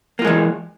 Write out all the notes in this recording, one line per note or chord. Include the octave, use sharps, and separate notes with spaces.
E3 G#3 A#3 F4